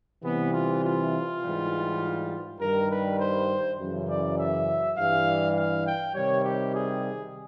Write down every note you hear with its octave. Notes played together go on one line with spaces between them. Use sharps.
C3 E3 G3 B3
F4
F4
G#2 E3 G3
G2 D#3 G3 A#4
B4
C5
F#2 C#3 E3
D5
E5
G2 E3 G3 F5
F5
G5
C3 D#3 G3 C#5
G4
G#4